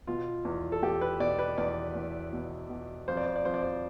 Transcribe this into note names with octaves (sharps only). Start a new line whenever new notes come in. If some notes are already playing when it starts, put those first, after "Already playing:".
B2 F4
E2
A4
E2 G4
B4
B2 D5
B4
E2 D5
E2
B2
B2
F2 C5
D5
C5
D5
F2 C5
D5
C5